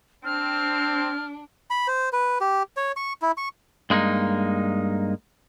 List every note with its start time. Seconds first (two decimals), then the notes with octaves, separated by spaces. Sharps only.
0.25 C4 D4 F6
1.70 B5
1.88 C5
2.13 B4
2.41 G4
2.77 C#5
2.96 C#6
3.22 E4
3.37 C#6
3.90 G2 G#3 A#3 D4 D#4